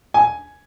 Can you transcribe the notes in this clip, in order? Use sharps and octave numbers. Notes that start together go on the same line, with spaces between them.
G#5